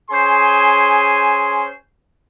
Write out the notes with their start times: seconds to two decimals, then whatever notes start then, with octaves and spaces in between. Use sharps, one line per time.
0.11 C#4 G#4 C5 G#5 C6